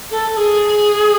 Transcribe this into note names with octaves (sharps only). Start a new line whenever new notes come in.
A4
A4
G#4